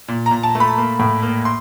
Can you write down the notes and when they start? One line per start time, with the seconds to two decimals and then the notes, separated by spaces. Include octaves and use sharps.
0.08 A#2
0.26 A#5
0.31 A#2
0.43 A5
0.55 A3
0.60 B5
0.78 A#3
0.99 A2
1.23 A#3
1.45 C6